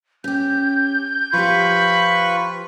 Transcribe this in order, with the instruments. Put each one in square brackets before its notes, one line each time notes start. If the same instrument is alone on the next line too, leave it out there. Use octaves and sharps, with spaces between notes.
[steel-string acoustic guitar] C#4 G4 [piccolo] G6
[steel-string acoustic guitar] F3 G4 [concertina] F4 B4 C#6 [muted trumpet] B5